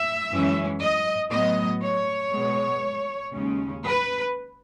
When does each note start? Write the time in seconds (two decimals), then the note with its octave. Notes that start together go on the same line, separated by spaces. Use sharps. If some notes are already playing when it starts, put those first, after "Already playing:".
Already playing: E5
0.30 F#2 E3 G#3 C#4
0.81 D#5
1.31 A2 F#3 B3 D#5
1.82 C#5
2.33 B2 G#3 B3
3.34 D#2 C#3 G#3 C#4
3.84 B4